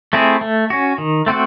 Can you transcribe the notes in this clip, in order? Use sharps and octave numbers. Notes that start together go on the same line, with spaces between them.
A3 C4 E4 G#4
A3
C#4 F#4
D#3
A3 C4 F#4